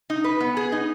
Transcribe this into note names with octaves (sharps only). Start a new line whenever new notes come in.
D#4
B4
B3
G#4
D#4